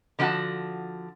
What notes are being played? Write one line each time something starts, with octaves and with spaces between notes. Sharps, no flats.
D3 F3 D4 F#4 F#5 A5